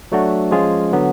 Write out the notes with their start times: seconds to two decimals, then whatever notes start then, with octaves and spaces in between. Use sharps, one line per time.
0.12 F#3 A3 D4 F#4
0.51 F3 G#3 C#4 F4 G#4
0.92 D3 F#3 B3